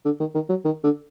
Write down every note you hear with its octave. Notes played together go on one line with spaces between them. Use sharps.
D3
D#3
D#3
F#3
D#3
D3